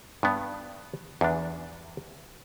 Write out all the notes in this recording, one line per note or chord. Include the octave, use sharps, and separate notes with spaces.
G2 B3
E2 D4